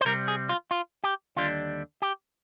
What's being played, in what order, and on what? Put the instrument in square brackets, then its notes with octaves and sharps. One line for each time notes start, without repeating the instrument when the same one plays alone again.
[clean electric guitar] C5
C2 C3 G3 C4 A#4
G#4
F4
F4
G4
D#2 D3 G3 D4 F4
G4